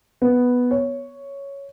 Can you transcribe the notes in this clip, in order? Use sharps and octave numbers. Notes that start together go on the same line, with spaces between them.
B3
C#5